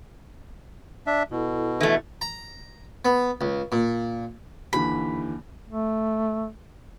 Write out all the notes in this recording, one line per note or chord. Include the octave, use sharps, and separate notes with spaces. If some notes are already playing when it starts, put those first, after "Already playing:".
D4 E5
B2 E4 A4
E3 A3
A#5
B3
C#2
A#2
D#2 D3 E3 B5
A3